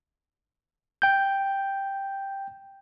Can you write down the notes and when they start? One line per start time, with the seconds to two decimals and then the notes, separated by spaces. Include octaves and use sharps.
1.02 G5 G6